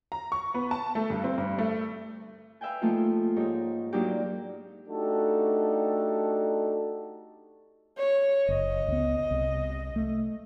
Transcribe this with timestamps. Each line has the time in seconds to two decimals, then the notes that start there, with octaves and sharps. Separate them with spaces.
0.12 A#5
0.32 C#6
0.54 B3
0.71 A5
0.95 A3
1.10 G2
1.24 C4
1.38 G2
1.58 A3
2.61 B4 E5 F5 G5 G#5
2.82 F3 A3 A#3 D#4 F4
3.36 G#2 D#4 G4 C#5
3.93 F#3 A#3 D4 D#4 F4 G4
4.89 A3 D4 D#4 F#4 G4 A4
7.98 C#5
8.49 F#1 D#5
8.88 C#2 B3
9.31 C2
9.96 A3